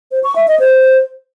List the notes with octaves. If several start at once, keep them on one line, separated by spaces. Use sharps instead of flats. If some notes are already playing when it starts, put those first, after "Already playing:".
C5
C#6
E5
D#5
C5